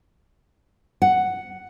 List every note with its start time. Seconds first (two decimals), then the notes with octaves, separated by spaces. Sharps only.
1.02 F#5